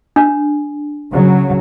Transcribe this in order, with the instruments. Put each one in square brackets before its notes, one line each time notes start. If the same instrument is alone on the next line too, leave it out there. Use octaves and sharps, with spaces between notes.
[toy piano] D4
[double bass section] C#3 F#3